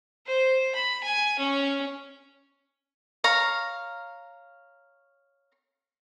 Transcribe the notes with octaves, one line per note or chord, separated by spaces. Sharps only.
C5
B5
G#5
C#4
C#5 F5 A#5